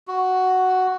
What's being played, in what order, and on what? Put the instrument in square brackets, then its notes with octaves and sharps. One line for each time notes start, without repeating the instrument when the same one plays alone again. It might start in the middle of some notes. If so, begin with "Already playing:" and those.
[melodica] F#4